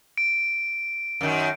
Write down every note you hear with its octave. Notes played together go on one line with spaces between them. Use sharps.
D7
F#2 D#3